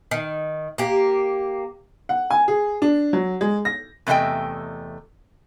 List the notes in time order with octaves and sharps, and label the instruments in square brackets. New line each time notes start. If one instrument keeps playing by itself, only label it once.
[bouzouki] D#3
A#3 G4
[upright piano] F#5
G#5
G#4
D4
F#3
G#3
A#6
[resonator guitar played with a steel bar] E2 C3 A3 C4 D#5 G5